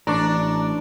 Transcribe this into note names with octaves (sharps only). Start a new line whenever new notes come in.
A1 D4 A#5 C#6 D6